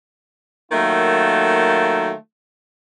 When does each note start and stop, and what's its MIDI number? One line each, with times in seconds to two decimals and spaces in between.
0.72 2.13 51
0.72 2.13 54
0.72 2.13 57
0.72 2.13 58
0.72 2.13 65
0.72 2.13 69